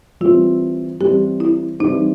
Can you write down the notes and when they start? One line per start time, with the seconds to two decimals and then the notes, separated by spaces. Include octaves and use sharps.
0.21 E3 G3 C4 F4
1.00 E3 G3 C4 G4
1.40 E4
1.80 E3 G3 C4 D#4